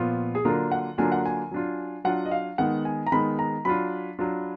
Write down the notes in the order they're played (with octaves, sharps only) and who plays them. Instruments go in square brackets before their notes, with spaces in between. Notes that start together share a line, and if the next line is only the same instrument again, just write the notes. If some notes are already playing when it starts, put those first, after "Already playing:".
Already playing: [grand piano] A#2 F3 B3 F4
G#4
D3 F#3 A#3 D4 F4 A#4
F#5
D3 F#3 A#3 D4 F4 G#5
F#5
G#5
F#3 D4 F4
F#3 D4 F4 F#5
D#5
F5
D#3 G#3 B3 F#5
G#5
A#5
D#3 G#3 B3 B5
A#5
F#3 D4 F4 B5
F#3 D4 F4